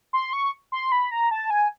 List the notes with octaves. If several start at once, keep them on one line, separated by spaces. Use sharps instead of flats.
C6
C#6
C6
B5
A#5
A5
G#5